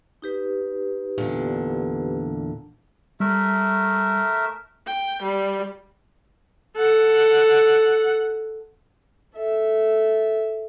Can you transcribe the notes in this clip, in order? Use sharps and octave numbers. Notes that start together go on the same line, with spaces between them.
D#4 G4 B4
E2 A#2 D3
G3 A3 A#4 E5
G5
G3
A4 F#5
A4 E5